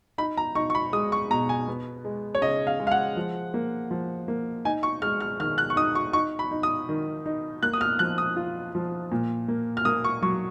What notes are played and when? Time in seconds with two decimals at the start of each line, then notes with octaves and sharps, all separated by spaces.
0.18 D#4 B5
0.37 A#5
0.55 D#4 C#6
0.70 C#6
0.75 B5
0.93 G#3 D#6
1.12 C#6
1.30 B2 A#5
1.49 G#5
1.68 B3
2.05 G#3
2.35 C#5
2.42 C#3 D#5
2.67 F5
2.80 G#3
2.87 F5
2.91 F#5
3.16 F3
3.54 A#3
3.91 F3
4.28 A#3
4.65 D#4 G#5
4.83 C#6
5.02 G#3 F6
5.20 F6
5.40 D#3 F6
5.58 F#6
5.70 C#6
5.76 D#4 D#6
5.95 C#6
6.13 D#4 C#6
6.39 B5
6.51 D#4
6.63 D#6
6.89 D#3
7.26 D#4
7.63 A#3 F#6
7.73 D#6
7.81 F6
7.99 F3 F#6
8.18 D#6
8.36 F4
8.75 F3
9.12 A#2
9.48 A#3
9.77 F6
9.85 A#3 D#6
10.04 C#6
10.22 F#3 C#6